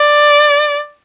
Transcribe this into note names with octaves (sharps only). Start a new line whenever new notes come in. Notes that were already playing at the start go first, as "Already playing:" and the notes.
Already playing: D5